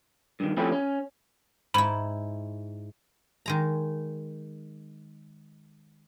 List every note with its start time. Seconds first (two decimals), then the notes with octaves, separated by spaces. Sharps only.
0.40 G2 D#3
0.57 F3 A3 C4 C#4 E4 G4
0.72 C#4
1.74 G#2 E4 B5
3.46 D#3 G#3 A#5